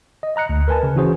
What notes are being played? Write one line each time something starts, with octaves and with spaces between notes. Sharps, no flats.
D#5
D#5 A#5 F#6 C#7
D2
A#4 B4 G#5 A5
C#3
E3 C#4 F#4 G#4 C5